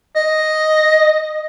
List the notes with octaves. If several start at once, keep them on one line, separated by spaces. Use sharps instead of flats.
D#5